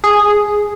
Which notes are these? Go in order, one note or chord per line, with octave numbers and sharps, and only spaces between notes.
G#4